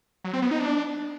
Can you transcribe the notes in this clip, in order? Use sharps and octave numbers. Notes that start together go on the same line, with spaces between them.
F#3
C4
B3
D#4
D4